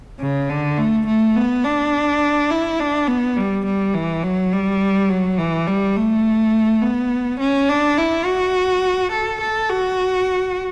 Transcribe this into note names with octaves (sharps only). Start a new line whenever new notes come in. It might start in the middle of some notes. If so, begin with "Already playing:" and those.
C#3
D3
A3
A3
B3
D4
E4
D4
B3
G3
G3
E3
F#3
G3
F#3
E3
G3
A3
B3
C#4
D4
E4
F#4
A4
A4
F#4